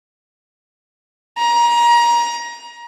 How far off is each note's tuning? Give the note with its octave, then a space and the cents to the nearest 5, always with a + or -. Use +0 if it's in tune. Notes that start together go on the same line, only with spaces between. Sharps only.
A#5 +25